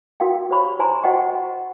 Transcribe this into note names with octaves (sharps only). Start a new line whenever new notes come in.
F#4 A#4 F5 G5
G4 C5 C#5 B5 C#6
C5 G#5 A#5 C6
F#4 C5 D#5 F#5 G5 C#6